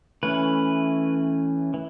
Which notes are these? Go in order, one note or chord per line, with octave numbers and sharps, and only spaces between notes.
E3 A3 C#4 B4
E3